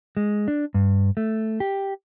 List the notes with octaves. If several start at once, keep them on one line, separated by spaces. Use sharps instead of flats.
G#3
D4
G2
A3
G4